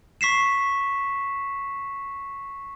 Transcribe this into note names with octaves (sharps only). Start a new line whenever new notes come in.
C#6 B6 C7 E7